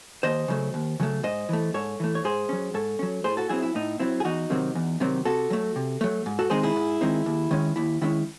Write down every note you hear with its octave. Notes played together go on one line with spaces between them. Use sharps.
D#2 C5 D#5
C#3 F#3 A3
D#2
C#3 F#3 A3
G#2 C5 D#5
E3 A3
G#2 A4 C#5
E3 A3
C#5
G#2 G#4 C5
F#3 C#4
G#2 A4 C#5
F#3 C#4
A2 G#4 C5
F#4 A4
F#3 C4 E4 G#4
E4
A2 D#4
F#3 C4 E4
G#4
E2 D#4 F#4
C3 D#3 F#3 C4
E2
C3 D#3 F#3 C4
C3 F#4 A4
F#3 A3
C3
F#3 A3
G#2
F#4 A4
D#3 G#3 C4 D#4 G#4 C5
E4 G#4
G#2
D#3 G#3 C4 D#4
D#2
D#3 G#3 C#4
D#2 E4
D#3 G#3 C#4 E4